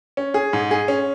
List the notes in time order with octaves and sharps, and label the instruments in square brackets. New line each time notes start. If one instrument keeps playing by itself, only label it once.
[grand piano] C#4
G#4
G#2
G#4
C#4